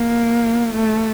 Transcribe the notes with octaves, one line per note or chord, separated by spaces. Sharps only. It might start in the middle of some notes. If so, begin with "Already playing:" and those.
Already playing: A#3
A3